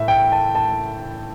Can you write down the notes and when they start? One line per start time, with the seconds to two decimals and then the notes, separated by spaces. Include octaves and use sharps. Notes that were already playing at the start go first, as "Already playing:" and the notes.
Already playing: A2 E5
0.08 G5
0.32 A5
0.55 A5